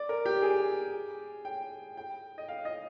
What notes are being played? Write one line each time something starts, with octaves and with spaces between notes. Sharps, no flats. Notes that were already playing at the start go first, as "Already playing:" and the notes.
Already playing: D5
A#4
G4
G#4
G5
G5
D#5
F5
D#5